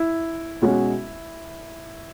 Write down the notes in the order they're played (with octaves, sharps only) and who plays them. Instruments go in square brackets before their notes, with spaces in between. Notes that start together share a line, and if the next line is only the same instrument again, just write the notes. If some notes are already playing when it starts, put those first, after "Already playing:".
Already playing: [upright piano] E4
[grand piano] B2 G#3 C#4 F#4